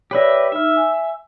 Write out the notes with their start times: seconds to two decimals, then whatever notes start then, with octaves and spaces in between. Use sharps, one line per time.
0.11 G4 B4 C#5 D5 E5 A#6
0.52 D#4 E5 F6
0.76 G#5